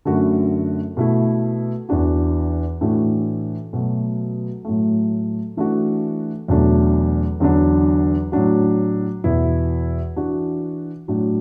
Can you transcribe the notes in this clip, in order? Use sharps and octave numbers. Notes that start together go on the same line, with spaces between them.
F#2 D3 A3 F#4
B2 A3 E4
E2 E3 D4 F#4
A2 E3 A3 D4 F#4
B2 F#3 A3
A2 F#3 A3
E3 A3 D4 F#4
E2 B2 F#3 A3 D4
E2 D3 F#3 D4
A2 F#3 D4 F#4
E2 B2 B3 E4
E3 D4 F#4
A2 F#3 D4 F#4